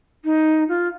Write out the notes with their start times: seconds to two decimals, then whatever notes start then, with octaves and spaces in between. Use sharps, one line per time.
0.25 D#4
0.69 F4